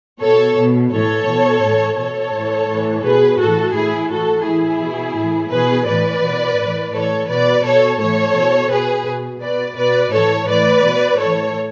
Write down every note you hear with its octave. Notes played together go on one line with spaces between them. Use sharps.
B2 A4 C#5
B2
A2 E3 A4 C#5
B2
A2 E3
B2 A4 C#5
A2 E3
A2 E3
B2 G#4 B4
A2 E3 F#4 A4
A2 E3 E4 G#4
A2 E3 F#4 A4
A2 E3 E4 G#4
B2
A2 E3
B2 G#4 B4
A2 E3 B4 D5
B2
A2 E3
A2 E3 A4 C#5
B2 B4 D5
B2 A4 C#5
A2 E3 A4 C#5
B2
B2 G#4 B4
B2
B2 B4 D5
B2 B4 D5
A2 E3 A4 C#5
A2 E3 B4 D5
B2
A2 E3 A4 C#5